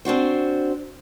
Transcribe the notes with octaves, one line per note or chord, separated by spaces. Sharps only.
C4 D4 F#4 C5